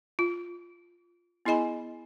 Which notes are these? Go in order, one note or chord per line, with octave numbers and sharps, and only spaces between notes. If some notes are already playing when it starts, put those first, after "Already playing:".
F4
B3 E4 G#4 D#5 G#5 B5